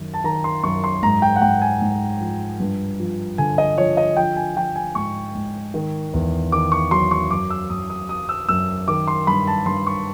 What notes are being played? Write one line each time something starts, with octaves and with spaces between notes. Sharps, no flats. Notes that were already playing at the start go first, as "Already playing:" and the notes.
Already playing: F#2 D#3
A5
D#3 A#5
C6
F#2 C#6
C6
G#2 A#5
G5
F#5
G#2 G5
G#5
G#2
F3
G2
F3
D3 G#5
D#5
F3 C#5
D#5
F3 G5
G#5
F3 G5
G#5
G#2 C#6
G#2
D#3
E2
D#3 D6
C#6
F#3 C6
C#6
F#2 D6
E6
F#2 D#6
D#6
F#3 D#6
E6
F#2 E6
D#3 D6
C6
G2 B5
A5
G2 C6
C#6